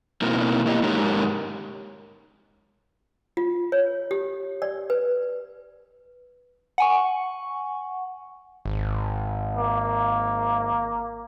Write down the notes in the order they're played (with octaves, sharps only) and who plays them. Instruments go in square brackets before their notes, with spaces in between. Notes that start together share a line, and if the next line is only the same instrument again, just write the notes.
[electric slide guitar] B2 A#3 C4 D#4 E4 A#4
A#3 E4 G4 D#5
G#2 G#3 D#4 G4 A#4 C#5
[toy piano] F4
C#5
G4
D5
B4
[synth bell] F#5 G#5 C#6
[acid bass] G#1
[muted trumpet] A#3